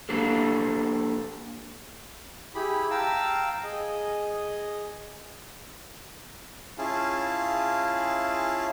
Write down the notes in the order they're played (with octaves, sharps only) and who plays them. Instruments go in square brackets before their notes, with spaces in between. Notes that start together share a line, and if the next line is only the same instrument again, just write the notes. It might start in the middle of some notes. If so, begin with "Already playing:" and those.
[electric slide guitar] A#3 D4 G4 A4
[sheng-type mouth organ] E4 G4 G#4 B5
F5 G5 A5 A#5 E6
G#4 D#5
C#4 E4 F4 G#4 F5 A5